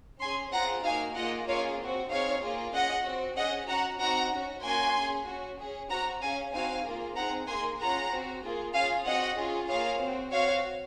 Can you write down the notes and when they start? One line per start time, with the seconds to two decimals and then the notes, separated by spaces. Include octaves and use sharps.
0.22 C#4 G#4 G#5 C6
0.54 C4 F4 G#4 F#5 A#5
0.85 A#3 D#4 F#4 F5 G#5
1.16 A#3 F4 G#4 D#5 F#5
1.48 A#3 C#4 F4 G#4 C#5 F5
1.80 C4 F#4
2.11 C4 D#4 G#4 C#5 F5
2.43 A#3 F4 G#4
2.75 C#4 G#4 D#5 F#5
3.06 C4 F#4
3.37 C#4 G#4 D#5 F#5
3.69 C#4 F#4 F#5 A#5
4.00 C4 D#4 F#4 F#5 A#5
4.33 C#4 F#4
4.63 A#3 C#4 F#4 G#5 C6
4.96 C#4 G#4
5.27 C#4 F#4
5.59 C#4 G#4
5.90 C4 F#4 F#5 A#5
6.22 C#4 G#4 F5 G#5
6.53 C4 D#4 F#4 F5 G#5
6.85 A#3 F4 G#4
7.16 C4 D#4 G#4 F#5 A#5
7.47 A#3 D#4 G#4 G#5 C6
7.80 C#4 F4 G#4 F#5 A#5
8.11 C4 F#4
8.43 A#3 F4 G#4
8.74 C#4 F4 G#4 F5 G#5
9.06 C4 F#4 D#5 F#5
9.38 C#4 F4 G#4
9.69 A#3 F4 G#4 C#5 F5
10.01 C4 F#4
10.32 C4 F#4 C#5 F5